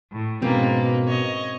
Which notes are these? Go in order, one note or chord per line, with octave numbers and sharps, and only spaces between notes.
A2
G#2 B2 A#3 C4 C#4 B4
C#5 D#5